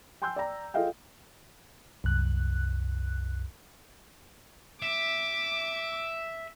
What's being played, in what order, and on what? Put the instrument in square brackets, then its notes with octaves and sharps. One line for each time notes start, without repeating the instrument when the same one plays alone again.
[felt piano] G5 G#5 C6 E6 G6
D5 G5 A#5
F4 G#4 A4 D#5 F5 G5
[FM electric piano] C2 F#2 F#6
[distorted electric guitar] E5 [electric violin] D6